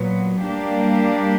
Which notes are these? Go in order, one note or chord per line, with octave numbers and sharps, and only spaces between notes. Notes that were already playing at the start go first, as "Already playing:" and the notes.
Already playing: A#2 F#3 B3
G3 A#3 D4 G4